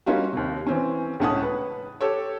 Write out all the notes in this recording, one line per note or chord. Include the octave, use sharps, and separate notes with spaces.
G3 A#3 C#4 D#4 F4 F#4
D#2 C3
E3 C4 C#4
C#2 A2 C#4 F#5 A5 D#6
B4
G4 A4 C#5